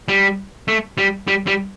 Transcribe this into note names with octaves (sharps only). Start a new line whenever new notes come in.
G3
A3
G3
G3
G3